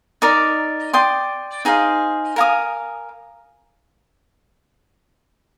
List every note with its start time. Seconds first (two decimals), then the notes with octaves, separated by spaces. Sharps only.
0.22 D#4 A#4 D5
0.93 D5 G5 C6 D#6
1.65 D#4 G#4 C5 F5
2.36 A#4 F5 G#5 D#6